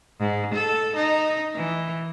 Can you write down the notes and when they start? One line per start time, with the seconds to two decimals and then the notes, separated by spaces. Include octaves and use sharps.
0.20 G#2
0.55 A4
0.96 D#4
1.55 E3